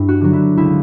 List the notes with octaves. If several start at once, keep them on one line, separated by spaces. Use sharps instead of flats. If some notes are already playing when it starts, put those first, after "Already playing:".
Already playing: G2 D4 E4
F#4
D3 F#3
E4
C#2 E4